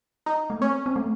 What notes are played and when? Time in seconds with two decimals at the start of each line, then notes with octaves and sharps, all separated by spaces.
0.26 D#4
0.50 A3
0.61 C4 C#4
0.86 C4
0.96 A3